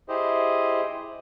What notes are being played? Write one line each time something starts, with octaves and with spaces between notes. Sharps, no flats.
E4 G4 G#4 C5 D#5